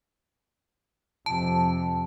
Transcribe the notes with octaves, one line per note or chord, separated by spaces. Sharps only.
F2 C3 A5